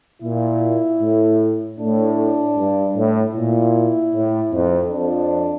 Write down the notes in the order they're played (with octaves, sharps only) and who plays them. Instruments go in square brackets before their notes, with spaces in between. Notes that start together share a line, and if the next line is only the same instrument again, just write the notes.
[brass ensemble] A#2 [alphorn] E4
[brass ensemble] A2
[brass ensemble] A2 [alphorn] D4
[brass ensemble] G2
A2
[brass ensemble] A#2 [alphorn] E4
[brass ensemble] A2
F2
[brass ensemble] F2 [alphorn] D4